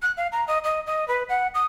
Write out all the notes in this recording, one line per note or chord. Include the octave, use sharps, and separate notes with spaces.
F#6
F5
A#5
D#5
D#5
D#5
B4
F#5
D#6